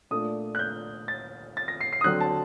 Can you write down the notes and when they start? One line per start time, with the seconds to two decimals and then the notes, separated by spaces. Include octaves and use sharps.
0.11 A#2 A3 D4 D#6
0.55 F#6
0.59 G6
1.08 A6
1.57 A6
1.68 A#6
1.81 C7
1.93 C7
2.01 D#6
2.04 D3 F#3 C4 F#6
2.20 A5